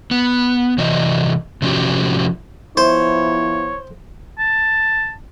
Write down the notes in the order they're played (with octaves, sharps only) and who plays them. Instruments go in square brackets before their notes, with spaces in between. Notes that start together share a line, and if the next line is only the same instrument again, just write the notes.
[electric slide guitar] B3
C3 E3 F#3 D#5
C3 F3 C#4 D#4 F#4 G4
[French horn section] F3 B3 E4 [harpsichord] C5 [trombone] C#5
[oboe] A5